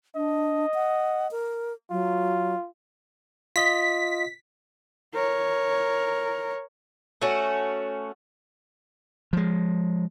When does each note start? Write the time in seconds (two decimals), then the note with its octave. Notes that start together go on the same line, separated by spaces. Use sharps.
0.16 D4 D#5
0.74 F#5
1.31 A#4
1.91 F#3 F4
3.56 F4 D#5 B6
5.14 A#4 C#5
7.22 A3 C#4 F#4
9.33 F3 G#3